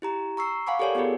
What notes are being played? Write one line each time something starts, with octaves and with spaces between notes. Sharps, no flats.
E4 G4 A#5
A#5 C#6 E6 C7
F5 F#5 G#5 B5 C#6 D6
G4 A4 A#4 C#5 D5 G#5
B3 F4 G4 G#4 A#4